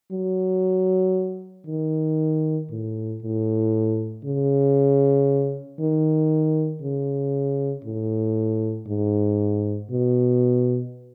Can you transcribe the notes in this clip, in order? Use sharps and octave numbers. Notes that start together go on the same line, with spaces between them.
F#3
D#3
A2
A2
C#3
D#3
C#3
A2
G#2
B2